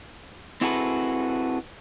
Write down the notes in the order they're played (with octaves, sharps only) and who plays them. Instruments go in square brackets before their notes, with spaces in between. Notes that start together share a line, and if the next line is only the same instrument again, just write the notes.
[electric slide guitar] C4 E4 F#4 G#4 A4 B4